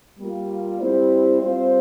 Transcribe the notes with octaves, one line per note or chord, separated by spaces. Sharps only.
G3 A#3 F4
G3 C4 E4 G4 C5
G3 C4 F4 C5